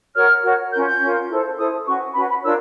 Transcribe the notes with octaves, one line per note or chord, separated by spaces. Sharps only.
F#4 A#4 C#5 F6
F#4 A#4 C#5
C#4 F4 A#4 G6
G6
C#4 F4 A#4
E4 A4 C5
E4 A4 C5 D#6
C#4 F#4 B4 C#6
C#4 F#4 B4 B5
B5
D4 F4 A#4 C#5 E6